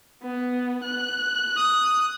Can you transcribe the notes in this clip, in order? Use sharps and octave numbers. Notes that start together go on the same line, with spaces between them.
B3
F#6
D#6